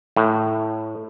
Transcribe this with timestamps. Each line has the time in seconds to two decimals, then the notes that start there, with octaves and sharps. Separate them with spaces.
0.16 A2